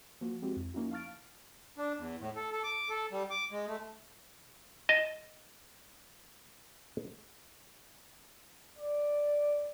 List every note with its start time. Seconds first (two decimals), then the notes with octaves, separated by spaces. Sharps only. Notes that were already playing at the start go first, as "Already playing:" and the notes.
0.21 F3 A#3 F#4
0.42 G#3 C4 E4 F#4 G4
0.56 F2
0.74 F3 A#3 C#4 D#4 E4 F#4
0.91 F5 A5 C#6 F6 A6 D7
1.78 D4
1.98 E2
2.20 A2
2.36 A4
2.52 A4
2.64 D6
2.89 A4
3.12 G3
3.30 D6
3.51 G#3
3.67 A3
4.89 D#5 A5
8.77 D5